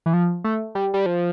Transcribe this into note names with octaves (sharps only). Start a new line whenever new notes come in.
E3
F3
A3
G3
G3
F3